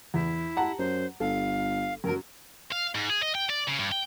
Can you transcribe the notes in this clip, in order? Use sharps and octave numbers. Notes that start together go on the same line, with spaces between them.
E2 E4
F#5 A5 A#5
F#2 C5
G1 A4 F5
F#2 F#3 A#4
F5
G#2
G#4
D#5
G5
D5
C#3
G2
G5